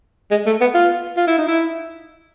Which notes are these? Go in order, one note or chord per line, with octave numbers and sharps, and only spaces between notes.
G#3
A3
B3
F4
F4
E4
D#4
E4